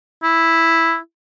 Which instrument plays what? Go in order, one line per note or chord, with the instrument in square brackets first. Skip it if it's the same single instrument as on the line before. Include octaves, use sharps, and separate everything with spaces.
[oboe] E4